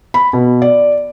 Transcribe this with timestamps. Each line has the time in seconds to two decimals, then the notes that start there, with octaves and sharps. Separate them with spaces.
0.14 B5
0.33 B2
0.62 D5